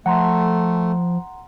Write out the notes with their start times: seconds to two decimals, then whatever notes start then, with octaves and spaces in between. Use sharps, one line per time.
0.06 F3 A3 F#5 A#5 C6